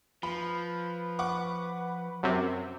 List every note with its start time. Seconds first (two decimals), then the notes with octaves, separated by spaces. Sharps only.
0.23 F3 B4 B5
1.19 F#5 C#6 D6
2.23 F#2 C3 E5